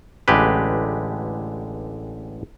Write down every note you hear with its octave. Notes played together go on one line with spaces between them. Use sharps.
A1 D3 G#3 G4 B4